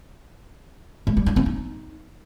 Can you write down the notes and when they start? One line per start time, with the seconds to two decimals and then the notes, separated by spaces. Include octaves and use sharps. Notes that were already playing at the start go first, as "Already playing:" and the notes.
1.07 A3
1.17 G3
1.26 D4
1.36 C4
1.46 D#4